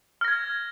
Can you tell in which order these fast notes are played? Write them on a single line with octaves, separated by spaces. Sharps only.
F6 A#6 G#6